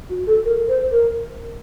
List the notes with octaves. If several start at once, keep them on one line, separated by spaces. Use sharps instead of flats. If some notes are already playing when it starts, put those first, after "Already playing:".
F#4
A4
A#4
C5
A#4